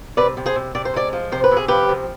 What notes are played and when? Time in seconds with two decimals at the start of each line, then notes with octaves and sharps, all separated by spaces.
0.17 C3 B4 D5
0.37 C3
0.46 G#4 C5
0.55 C3
0.75 C3 D5
0.85 C5
0.94 G#3 B4 D5
1.13 F3
1.32 C3 C5
1.44 B4
1.51 C3
1.57 G#4
1.68 F3 G4 B4
1.89 C3